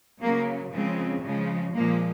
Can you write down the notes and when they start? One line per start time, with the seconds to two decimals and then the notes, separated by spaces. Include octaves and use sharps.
0.22 C#3 F#3 A#3
0.72 C#3 F3 G#3 C4
1.23 C#3 F3 G#3
1.74 A#2 F3 G#3 A#3